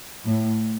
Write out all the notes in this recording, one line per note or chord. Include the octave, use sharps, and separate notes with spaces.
A2